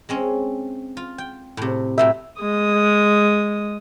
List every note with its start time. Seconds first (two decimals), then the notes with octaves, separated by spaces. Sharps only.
0.09 G#3 C4 C#4
0.97 F4
1.18 G5
1.57 A2 C3
1.98 A2 F#3 E5 G5
2.40 G#3 D#6